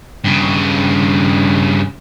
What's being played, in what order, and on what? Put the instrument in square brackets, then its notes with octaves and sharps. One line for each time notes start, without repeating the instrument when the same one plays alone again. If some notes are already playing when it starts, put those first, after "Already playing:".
[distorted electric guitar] G2 C#3